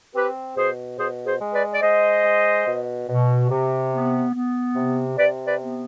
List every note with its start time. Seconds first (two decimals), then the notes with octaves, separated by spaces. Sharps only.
0.13 C4 G4 B4
0.56 B2 G#4 C5
0.98 B2 G#4 C5
1.25 G#4 C5
1.39 G#3
1.53 B4 D5
1.72 D5
1.81 G#3 C5 D#5
2.24 G#3
2.65 B2
3.07 B2
3.50 C3
3.91 B3
4.33 B3
4.75 C3
5.17 C3 B4 D5
5.45 B4 D5
5.59 B3